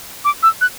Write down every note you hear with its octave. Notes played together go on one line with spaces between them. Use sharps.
D6
E6
F#6